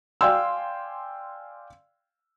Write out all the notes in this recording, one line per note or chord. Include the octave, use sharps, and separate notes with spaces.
D5 F5 G5 G#5 C6 E6